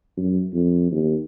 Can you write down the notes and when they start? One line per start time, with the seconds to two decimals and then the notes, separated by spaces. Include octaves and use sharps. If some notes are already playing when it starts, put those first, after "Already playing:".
0.17 F#2
0.53 F2
0.91 D#2